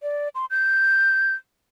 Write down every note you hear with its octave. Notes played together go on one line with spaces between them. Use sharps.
D5
C6
G6